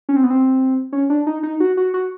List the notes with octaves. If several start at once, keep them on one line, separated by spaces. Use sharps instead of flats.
C#4
C4
B3
C4
C#4
D4
D#4
D#4
F#4
F#4
F#4